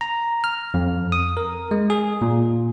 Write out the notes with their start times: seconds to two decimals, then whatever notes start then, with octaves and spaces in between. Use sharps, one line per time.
0.01 A#5
0.44 F6
0.74 F2
1.12 D#6
1.37 A#4
1.71 G#3
1.90 G#4
2.21 A#2